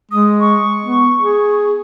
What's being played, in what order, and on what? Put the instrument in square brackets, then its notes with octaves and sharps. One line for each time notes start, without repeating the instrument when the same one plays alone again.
[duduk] G#3 [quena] D#6
[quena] C#6
[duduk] B3
G#4